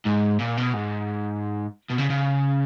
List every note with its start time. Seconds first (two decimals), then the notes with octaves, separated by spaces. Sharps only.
0.05 G#2
0.39 A#2
0.57 B2
0.73 G#2
1.90 B2
1.99 C#3
2.10 C#3